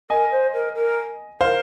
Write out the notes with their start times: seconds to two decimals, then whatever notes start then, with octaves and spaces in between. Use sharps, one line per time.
0.10 A#4 D#5 G#5
0.32 C5
0.54 A#4
0.75 A#4
1.41 A#4 C5 F5